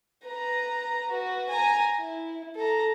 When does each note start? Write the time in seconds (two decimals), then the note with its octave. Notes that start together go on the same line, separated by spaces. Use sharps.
0.24 B4 A#5
1.10 F#4 B4
1.49 G#5 A#5
1.99 E4
2.56 A4 A#5